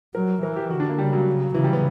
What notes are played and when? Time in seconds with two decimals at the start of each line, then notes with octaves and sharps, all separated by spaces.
0.14 F#3 A#4
0.43 E3 A#4
0.56 G4
0.71 D3 F#4
0.80 D4
0.89 A#3
0.98 C#3 G3
1.13 F#3
1.54 C#3 E3
1.64 G3
1.73 B3